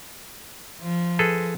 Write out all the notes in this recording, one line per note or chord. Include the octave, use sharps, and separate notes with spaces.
F3
G#4 A4 B4